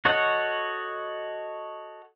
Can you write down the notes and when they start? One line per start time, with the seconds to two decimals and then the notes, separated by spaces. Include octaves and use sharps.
0.05 F#4 A4 C#5 D#5 F#5